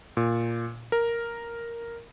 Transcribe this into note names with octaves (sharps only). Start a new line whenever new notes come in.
A#2
A#4